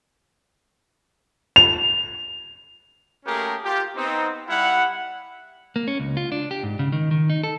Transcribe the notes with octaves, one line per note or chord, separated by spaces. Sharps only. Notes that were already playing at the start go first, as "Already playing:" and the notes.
F7
A3 A#3 C#4 G4 G#4 A#4
F4 G4
B3 C4 D#4
G3 E4 F5 F#5
A#3
C#4
C#2
F4
D4
G4
G#2
C#3
D#3
D#3
D#4
A4